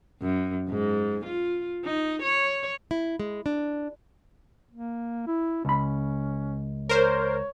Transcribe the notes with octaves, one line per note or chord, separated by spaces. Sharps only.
F#2
G#2
F4
D#4
C#5
E4
G#3
D4
A#3
E4
C#2 C#4 B5
A#4 C5 C#5